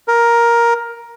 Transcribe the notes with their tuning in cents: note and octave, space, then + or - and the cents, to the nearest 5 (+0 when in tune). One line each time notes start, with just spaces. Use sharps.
A#4 +10